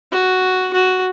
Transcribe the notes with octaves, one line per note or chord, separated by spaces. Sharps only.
F#4
F#4